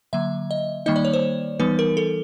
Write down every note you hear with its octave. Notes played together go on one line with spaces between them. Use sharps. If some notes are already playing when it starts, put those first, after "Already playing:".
D3 F#3 A#3 E5
D#5
D#3 G3 A#3 D#4 D#5
D5
C#5
C5
E3 G3 B3 D#4 B4
A#4
A4